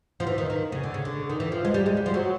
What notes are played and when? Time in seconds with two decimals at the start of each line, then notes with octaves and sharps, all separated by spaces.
0.20 F3
0.27 E3
0.38 D#3
0.50 D#3
0.72 C#3
0.84 D3
0.94 C#3
1.05 D3
1.29 D#3
1.40 E3
1.52 F3
1.65 G#3
1.74 G3
1.86 G#3
1.97 G3
2.06 F3
2.14 F#3